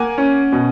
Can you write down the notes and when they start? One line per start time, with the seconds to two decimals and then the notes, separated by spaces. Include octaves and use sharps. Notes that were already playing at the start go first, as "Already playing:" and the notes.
Already playing: A#3 F#5 G#5
0.18 C#4
0.52 B2